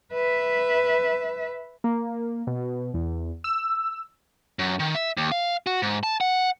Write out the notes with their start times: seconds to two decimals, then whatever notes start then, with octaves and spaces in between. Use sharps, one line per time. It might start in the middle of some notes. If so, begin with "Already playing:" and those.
0.13 B4 E5
1.84 A#3
2.47 B2
2.94 E2
3.44 E6
4.59 F#2
4.80 D#3
4.95 E5
5.17 D#2
5.32 F5
5.67 F#4
5.82 G#2
6.03 A5
6.21 F#5